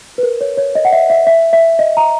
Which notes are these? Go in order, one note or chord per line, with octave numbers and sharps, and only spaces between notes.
B4
A#4
C#5
C#5
D#5
F#5
E5
E5
E5
E5
D#5
A#5